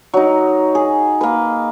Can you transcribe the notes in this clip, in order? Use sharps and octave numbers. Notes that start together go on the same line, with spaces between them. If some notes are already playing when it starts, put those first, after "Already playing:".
F#3 D#4
G#4
A#3 B4